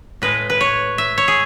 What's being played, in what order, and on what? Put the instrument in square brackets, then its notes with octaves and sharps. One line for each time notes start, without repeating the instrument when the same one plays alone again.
[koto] A2 G#3 B4
B4
C#5
E5
C#5
G#4